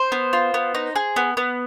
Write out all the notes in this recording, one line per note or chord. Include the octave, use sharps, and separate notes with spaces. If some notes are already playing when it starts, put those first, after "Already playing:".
Already playing: C5
B3
F4
B3
D#4
G#4
B3
B3